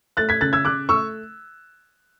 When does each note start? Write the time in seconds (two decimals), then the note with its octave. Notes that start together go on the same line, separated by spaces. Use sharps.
0.17 A3 F#6 A6
0.29 G#6 B6
0.41 C#3 F#6 A6
0.53 E6 G#6
0.65 C#3 D6 F#6
0.89 A3 C#6 E6